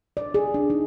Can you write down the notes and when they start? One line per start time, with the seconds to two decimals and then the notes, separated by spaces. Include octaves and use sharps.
0.17 D5
0.34 G#4
0.54 D4
0.70 D#4